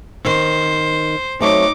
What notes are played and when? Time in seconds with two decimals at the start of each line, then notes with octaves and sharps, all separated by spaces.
0.25 D#3 C4 C5
1.41 F#3 A3 C4 D#4 D6